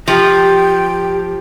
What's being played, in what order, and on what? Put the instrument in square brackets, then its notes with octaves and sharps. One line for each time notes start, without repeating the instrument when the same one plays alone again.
[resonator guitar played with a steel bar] F3 [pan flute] G4 [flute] G5